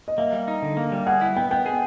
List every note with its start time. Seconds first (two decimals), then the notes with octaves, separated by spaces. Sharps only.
0.08 D#5
0.18 A#3 E5
0.33 G3
0.48 D#4
0.62 D3
0.77 A#3
0.92 G3
1.07 G#4 F#5
1.21 E4 F#5
1.37 B3 G5
1.51 B3 G5
1.66 G#4